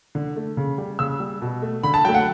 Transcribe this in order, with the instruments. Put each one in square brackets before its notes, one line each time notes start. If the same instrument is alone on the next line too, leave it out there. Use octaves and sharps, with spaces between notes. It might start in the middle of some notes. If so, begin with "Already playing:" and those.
[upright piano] D3
A3
C#3
G3
C#3 E6
G3
B2
A3
D3 B5
A5
F#3 A3 G5
F#5